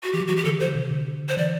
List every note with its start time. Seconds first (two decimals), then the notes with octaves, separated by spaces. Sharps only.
0.03 F#4
0.13 E3 G4
0.21 F#3
0.28 E3 F#4
0.36 G4
0.44 D3 A4
0.60 E3 C5
0.68 D3
0.75 C3
0.91 D3
1.29 C5
1.37 E3 D5